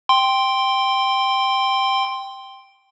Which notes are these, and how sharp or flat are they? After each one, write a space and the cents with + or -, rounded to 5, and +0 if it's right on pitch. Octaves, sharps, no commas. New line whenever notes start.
G5 +0 C6 +0